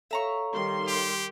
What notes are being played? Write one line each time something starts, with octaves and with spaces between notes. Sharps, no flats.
A4 C#5 E5 F5 A#5 C#6
D#3 G3 C6
G4